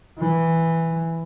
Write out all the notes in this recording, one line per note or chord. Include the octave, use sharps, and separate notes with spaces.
E3